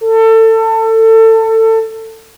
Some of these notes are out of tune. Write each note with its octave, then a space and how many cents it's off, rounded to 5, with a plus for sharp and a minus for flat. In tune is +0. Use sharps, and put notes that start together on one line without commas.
A4 +25